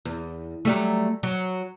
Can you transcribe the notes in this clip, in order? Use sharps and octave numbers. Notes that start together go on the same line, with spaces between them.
E2
F#3 G3 A3
F#3